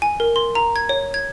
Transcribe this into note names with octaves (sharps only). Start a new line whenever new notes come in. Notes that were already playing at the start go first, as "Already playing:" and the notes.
G#5
A#4
C6
A#5
G#6
C#5
G#6